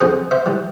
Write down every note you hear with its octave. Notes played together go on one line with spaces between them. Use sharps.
F2 G#4 C5
C5 E5
E3 G3